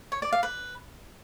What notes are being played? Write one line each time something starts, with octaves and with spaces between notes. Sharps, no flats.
C#5
D5
F5
B4